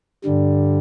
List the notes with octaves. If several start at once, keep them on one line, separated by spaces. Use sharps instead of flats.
G2 D3 G3